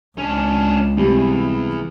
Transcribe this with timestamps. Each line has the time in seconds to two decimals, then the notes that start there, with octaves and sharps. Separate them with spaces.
0.18 C#2 C#4 D4
0.97 E2 C3 G3